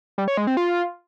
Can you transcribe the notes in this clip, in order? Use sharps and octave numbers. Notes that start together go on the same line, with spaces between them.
G3
C#5
G#3
C4
F4